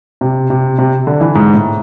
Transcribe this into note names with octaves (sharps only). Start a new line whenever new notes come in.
C3
C3
C3
D3
E3
G#2
A2